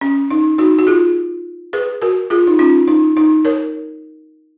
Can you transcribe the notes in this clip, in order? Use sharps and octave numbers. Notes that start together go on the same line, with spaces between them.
C#4
D#4
D#4 F#4
F#4
F4 G#4
G#4 B4
F#4 A#4
F4 G#4
D#4
C#4 F4
D#4
D#4
A#4 C#5